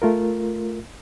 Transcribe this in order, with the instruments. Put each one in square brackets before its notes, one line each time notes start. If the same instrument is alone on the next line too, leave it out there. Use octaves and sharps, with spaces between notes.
[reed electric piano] A3 F4 A#4